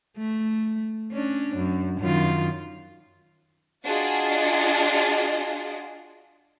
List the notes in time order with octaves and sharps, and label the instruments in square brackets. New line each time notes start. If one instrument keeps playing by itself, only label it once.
[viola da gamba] A3
C#4 D4
F#2
F#2 D#3 F4
[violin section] D4 F4 F#4 G#4 D#5